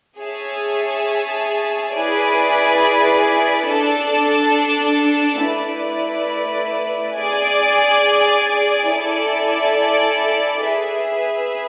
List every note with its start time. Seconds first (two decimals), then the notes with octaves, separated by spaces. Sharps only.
0.18 G#4 C#5 E5 A5
1.92 E4 G#4 B4 D5 G#5
3.66 D4 A4 D5 A5
5.41 A3 E4 B4 D5
7.15 G#4 D5 G#5
8.88 E4 A4 D5 G#5
10.63 G#4 B4 E5